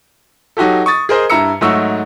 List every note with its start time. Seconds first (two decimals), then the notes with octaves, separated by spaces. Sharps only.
0.57 F#3 D#4 F#4 G4 A4
0.86 C#6 D#6 A6
1.09 G#4 A#4 C5 D#5
1.30 G2 E4 A#5 E6 C#7
1.61 G#2 F#3 A3 D#4 C#6 E6